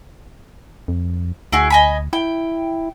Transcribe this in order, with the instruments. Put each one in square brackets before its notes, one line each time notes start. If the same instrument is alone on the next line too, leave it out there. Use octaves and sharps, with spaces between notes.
[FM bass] F2
[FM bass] D2 [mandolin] E4 F#4 G#4
[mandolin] D#5 G#5 B5
[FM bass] E4 [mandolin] G5